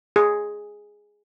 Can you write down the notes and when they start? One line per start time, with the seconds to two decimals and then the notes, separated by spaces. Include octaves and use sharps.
0.16 G#4